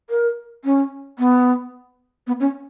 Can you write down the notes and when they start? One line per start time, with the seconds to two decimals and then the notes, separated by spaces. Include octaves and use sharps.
0.10 A#4
0.64 C#4
1.19 B3
2.27 B3
2.40 C#4